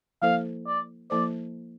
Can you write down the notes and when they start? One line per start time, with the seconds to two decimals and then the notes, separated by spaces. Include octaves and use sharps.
0.22 F3 A#3 E4 A4 C5 F5
0.66 D5
1.10 F3 A#3 E4 A4 C5 D5